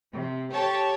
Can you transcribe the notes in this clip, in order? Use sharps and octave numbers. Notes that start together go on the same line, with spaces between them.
C3
G4 A4 C#5 A5